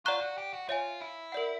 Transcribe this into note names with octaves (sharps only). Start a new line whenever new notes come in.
F4 D5 F#5 A#5 C#6 F#6
F#4
G4
F#4
F4 C#5 E5 G#5
E4
A#4 D5 F#5